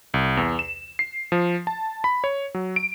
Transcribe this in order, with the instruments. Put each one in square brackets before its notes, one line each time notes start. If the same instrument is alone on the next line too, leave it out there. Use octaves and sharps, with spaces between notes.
[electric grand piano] C2
E2
E7
C7
F3
A5
B5
C#5
F#3
D7